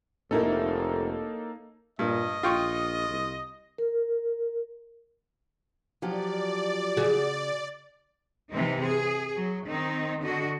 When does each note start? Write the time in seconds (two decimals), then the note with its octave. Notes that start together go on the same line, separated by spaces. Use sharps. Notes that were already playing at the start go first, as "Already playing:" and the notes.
0.31 F1 A#3 C#4 D#4 E4 A4 A#4
1.99 G2 A#2 D#5
2.43 A#1 F4 G5 C#6
3.09 C2
3.78 A#4
6.02 F3 F#3 G4 D5
6.97 C#3 F#4 G#4
8.51 C3 E3 C4 D#4
8.81 G#4
9.36 F#3
9.67 D#3 C4 D#4
10.22 D3 F#4 D#5